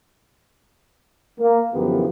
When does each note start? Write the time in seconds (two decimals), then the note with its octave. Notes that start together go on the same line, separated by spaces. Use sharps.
1.39 A#3
1.74 F#2 D3 E3 F3 B3 G4